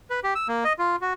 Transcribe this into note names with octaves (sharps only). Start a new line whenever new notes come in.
B4
G4
E6
A#3
D#5
F4
F#4